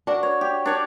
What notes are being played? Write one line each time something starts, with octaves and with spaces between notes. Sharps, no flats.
D4 F#4 A#4
C#5
G4
D4 C#5 D5